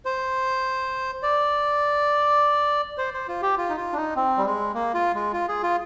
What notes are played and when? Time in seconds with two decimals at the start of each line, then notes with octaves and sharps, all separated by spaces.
0.05 C5
1.23 D5
2.98 C5
3.14 C5
3.28 F4
3.42 G4
3.57 F4
3.69 D#4
3.77 F4
3.93 D4
3.96 D#4
4.16 C4
4.37 G3
4.45 G#3
4.74 A#3
4.94 F4
5.14 G#3
5.33 F4
5.48 G#4
5.63 F4